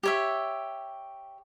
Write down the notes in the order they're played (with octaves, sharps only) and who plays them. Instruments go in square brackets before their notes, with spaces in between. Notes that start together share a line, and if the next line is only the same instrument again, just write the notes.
[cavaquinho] G4 C#5 E5